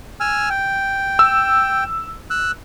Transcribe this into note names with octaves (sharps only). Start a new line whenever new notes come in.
G#5 E6 F6
G5
E6
E6 F#6